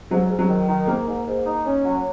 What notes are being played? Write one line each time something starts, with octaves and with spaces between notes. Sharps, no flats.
G#2 F#3
G#2
F#3
D#3
D#3
G#2 A#3
G#2
G#2
D#4
C#4
F#3